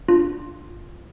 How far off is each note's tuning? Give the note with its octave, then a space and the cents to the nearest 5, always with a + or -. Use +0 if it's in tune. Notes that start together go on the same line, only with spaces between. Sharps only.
D4 +0 F4 +0